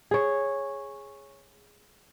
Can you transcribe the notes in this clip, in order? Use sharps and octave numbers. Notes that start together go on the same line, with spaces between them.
G#4 C#5